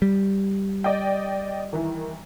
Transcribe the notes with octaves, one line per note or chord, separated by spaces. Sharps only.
G3
D5 D#5 G5
D#3 E3